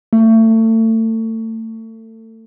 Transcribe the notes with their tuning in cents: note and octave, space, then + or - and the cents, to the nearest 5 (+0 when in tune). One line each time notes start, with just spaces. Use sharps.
A3 +30